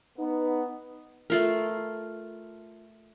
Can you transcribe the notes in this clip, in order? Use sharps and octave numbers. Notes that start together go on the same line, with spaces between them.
B3 D#4
A3 F4 A#4